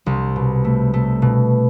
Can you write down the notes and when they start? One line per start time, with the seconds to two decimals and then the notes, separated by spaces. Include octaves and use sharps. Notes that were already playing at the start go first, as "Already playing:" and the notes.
0.06 C2
0.36 B2
0.65 A3
0.94 A3
1.22 B2